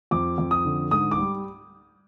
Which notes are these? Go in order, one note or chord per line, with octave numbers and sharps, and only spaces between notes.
F2 D6
F2
D#6
D3
G#2 D#6
D6
G3